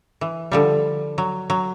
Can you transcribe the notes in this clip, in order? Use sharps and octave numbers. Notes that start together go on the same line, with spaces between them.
E3
D3 F3 G3
F#3
F#3